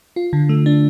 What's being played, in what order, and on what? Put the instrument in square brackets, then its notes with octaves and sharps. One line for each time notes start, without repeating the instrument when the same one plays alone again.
[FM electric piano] F4
D3
A3
D4